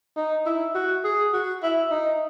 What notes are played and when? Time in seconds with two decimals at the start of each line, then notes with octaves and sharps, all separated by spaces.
0.16 D#4
0.46 E4
0.74 F#4
1.04 G#4
1.33 F#4
1.63 E4
1.91 D#4